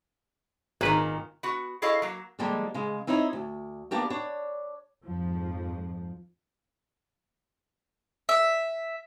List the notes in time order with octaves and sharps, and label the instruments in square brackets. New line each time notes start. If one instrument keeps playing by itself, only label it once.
[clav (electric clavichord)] G#1 B4 [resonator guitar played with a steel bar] A#2 D#3
[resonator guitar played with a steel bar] B3 F#4
E4 G#4 A4 C#5 D#5 F5
F#3 A#3
[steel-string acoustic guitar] D3 F3 G3 G#3 A#3
C#3 G#3
C4 D#4 E4 C#5 D#5
D2
A#3 B3 D4 G4 A#4
D4 C#5
[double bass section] F2 G#2 F3
[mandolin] E5